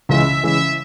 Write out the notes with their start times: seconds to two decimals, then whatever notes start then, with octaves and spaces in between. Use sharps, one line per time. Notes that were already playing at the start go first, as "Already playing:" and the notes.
0.09 C#2 C#3 E3 G#3 E5
0.43 C#3 E3 G#3 E5